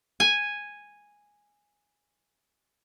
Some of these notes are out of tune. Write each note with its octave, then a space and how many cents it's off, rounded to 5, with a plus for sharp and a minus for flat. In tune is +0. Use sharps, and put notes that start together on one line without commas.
G#5 -5